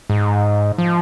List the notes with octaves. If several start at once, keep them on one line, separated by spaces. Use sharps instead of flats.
G#2
F3